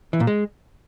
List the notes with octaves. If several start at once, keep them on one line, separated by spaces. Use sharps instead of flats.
E3
A#2
G#3